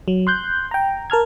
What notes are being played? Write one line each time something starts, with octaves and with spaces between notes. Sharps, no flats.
F#3
C6 F#6 G6
G5 A#5
A#4 A5 F6 G#6